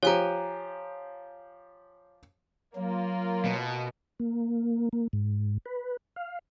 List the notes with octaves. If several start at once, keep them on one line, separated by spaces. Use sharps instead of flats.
F3 G4 C#5 G#5 A#5
F#3 A#3 F4
B2
A#3
A#3
G#2
B4
F5